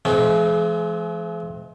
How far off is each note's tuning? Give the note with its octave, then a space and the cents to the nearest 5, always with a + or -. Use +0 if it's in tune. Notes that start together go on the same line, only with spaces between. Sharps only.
E3 +45 G#3 +40 C4 -10